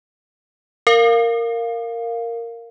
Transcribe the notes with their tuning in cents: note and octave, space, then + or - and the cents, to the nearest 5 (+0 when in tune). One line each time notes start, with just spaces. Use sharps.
A#4 -10 F5 +0